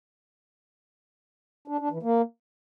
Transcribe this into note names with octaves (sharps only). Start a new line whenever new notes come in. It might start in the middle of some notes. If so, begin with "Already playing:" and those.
D4
D4
E3
A#3